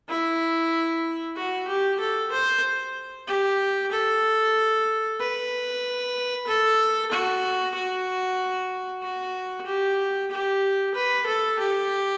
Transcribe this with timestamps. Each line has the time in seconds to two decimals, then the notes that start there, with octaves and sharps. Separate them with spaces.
0.09 E4
1.36 F#4
1.68 G4
2.00 A4
2.32 C5
3.28 G4
3.92 A4
5.20 B4
6.47 A4
7.12 F#4
7.75 F#4
9.03 F#4
9.66 G4
10.31 G4
10.95 B4
11.26 A4
11.59 G4